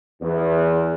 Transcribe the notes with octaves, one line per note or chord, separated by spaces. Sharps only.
E2